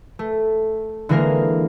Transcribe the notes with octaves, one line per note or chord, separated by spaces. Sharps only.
A3
D3 E3 G#3 A#3 A#4